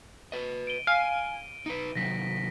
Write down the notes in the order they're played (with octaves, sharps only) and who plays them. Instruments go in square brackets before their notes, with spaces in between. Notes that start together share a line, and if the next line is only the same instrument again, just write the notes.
[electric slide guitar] B4 D#5
[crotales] D7 D#7 G7
[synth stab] F5 [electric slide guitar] G#5
[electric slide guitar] D#4 B4
[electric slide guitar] C3 D#3 F#3 [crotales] A#6 B6